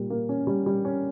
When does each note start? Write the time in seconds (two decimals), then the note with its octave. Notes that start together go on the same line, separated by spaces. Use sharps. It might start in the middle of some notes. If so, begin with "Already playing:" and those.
Already playing: A#2 G3 A#3
0.10 A#3
0.29 C#4
0.47 G3
0.66 G3
0.85 C#4